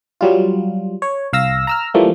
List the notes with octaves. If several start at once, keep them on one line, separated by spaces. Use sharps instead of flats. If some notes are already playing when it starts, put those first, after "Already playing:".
F#3 G3 F4
C#5
C2 F5 E6 A#6
A#5 E6 F6
E3 F3 G3 A3 A#3